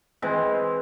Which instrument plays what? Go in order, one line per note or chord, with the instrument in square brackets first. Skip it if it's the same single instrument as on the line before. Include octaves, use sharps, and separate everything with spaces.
[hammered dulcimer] E3 G#3 C4